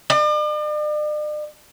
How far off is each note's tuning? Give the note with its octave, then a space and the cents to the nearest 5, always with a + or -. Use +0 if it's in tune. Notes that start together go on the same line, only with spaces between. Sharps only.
D5 +45